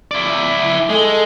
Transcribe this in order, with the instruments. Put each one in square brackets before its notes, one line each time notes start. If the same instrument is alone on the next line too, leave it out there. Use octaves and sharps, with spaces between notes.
[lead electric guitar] E4 D5
[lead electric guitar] G#3 [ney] A4